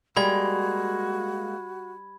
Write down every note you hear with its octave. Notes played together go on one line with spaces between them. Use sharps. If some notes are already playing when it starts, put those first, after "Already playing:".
G3 G#3 A#3 F#4 B5 G#6